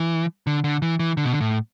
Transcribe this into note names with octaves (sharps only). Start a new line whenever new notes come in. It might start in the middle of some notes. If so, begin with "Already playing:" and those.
Already playing: E3
D3
D3
E3
E3
D3
B2
D3
A2